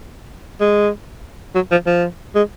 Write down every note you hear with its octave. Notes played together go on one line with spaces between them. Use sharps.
G#3
F#3
F3
F3
G#3